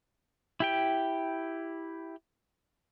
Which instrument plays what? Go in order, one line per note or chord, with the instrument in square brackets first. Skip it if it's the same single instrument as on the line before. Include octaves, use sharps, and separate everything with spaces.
[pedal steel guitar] E4 G4 G5